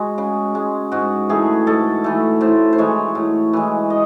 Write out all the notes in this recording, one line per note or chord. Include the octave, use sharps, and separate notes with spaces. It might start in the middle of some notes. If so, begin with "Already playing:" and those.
Already playing: G#3 F#4
C#3
G#3
G#2 F#4
E3 A3 G#4
G#2 A4
E3 A3
A2 C5
C5
E3 G#3 C#5
A2
E3 G#3
D#5